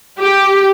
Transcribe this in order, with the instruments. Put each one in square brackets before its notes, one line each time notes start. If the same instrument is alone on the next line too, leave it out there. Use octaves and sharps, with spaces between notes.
[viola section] G4